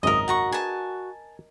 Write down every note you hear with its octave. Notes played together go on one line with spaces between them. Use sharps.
G#1 C#2 F#2 A#4 D#5 D#6
F#4 F#5 A#5 C#6
D4 G#4 B4 G#5 A5